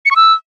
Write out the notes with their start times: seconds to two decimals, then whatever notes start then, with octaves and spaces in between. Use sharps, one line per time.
0.06 C#7
0.11 C#6
0.16 E6